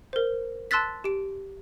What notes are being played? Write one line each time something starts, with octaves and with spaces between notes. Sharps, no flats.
A#4 C5
A5 C6 E6 F#6 A6 B6
G4 D7